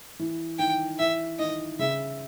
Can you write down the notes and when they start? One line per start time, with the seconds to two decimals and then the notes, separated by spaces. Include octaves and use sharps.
0.19 E3
0.59 D#3 G5
0.99 E3 E5
1.39 D#3 D#5
1.79 C#3 E5